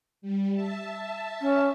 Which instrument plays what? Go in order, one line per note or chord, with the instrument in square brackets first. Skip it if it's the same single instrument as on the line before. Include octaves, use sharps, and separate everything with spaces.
[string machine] G3
E5 A5
[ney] C#4